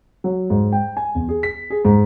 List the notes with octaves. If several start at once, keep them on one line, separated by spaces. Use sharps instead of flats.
F#3
G#2
G5
G#5
E2
G#4
B6
G#4
G#2